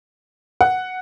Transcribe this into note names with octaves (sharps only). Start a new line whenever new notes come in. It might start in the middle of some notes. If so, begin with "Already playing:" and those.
F#5